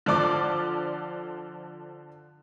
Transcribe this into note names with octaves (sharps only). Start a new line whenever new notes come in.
D3 F3 D5 D6